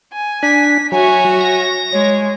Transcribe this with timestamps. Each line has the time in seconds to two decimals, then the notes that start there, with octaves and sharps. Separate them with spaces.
0.13 G#5
0.43 D4 B6
0.92 F#3 F#4 C#5 E5 G#5
1.41 A#6
1.92 G#3 C#5